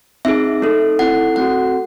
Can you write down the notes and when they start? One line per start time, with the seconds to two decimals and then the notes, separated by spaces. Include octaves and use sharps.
0.25 C4 D#4 G#4 E5
0.62 A3 D#4 A4
0.99 C4 E4 A4 F#5
1.36 A3 C4 F#4 A4 F#5